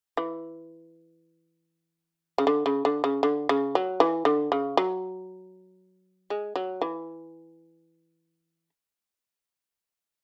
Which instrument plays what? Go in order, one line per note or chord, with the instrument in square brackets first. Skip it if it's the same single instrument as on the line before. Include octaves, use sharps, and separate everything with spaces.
[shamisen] E3
C#3
D3
C#3
D3
C#3
D3
C#3
F#3
E3
D3
C#3
F#3
G#3
F#3
E3